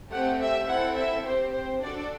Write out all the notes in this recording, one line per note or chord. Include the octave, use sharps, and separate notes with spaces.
A3 C4 G4 F#5
E5
C4 E4 A4 F#5
E5
C4 G4 C5
C5
D4 F#4 A4 D5